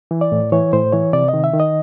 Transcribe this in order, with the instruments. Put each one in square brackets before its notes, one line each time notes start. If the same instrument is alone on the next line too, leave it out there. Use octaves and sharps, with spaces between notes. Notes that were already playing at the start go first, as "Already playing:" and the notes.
[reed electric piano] E3
D5
A2
E3 C#5
A2 C5
E3 C#5
C3 D5
D#5
D#3
E5
D#3
D#5